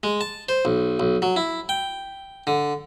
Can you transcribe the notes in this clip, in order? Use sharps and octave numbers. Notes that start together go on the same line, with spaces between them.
G#3
A5
C5
B1
B1
F#3
E4
G5
D3